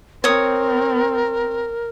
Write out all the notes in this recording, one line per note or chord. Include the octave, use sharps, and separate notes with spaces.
C4 A#4 C#5 D#6